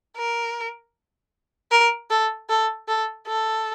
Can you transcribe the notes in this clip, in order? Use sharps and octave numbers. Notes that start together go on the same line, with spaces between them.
A#4
A#4
A4
A4
A4
A4